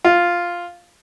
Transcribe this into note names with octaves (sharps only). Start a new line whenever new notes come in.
F4